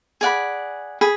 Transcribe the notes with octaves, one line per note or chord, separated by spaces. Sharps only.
G#4 D5 F#5 B5
G#4 B5